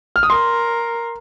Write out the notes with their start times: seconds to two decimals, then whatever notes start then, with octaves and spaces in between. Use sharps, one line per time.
0.16 F6
0.23 D#6
0.30 A#4 C6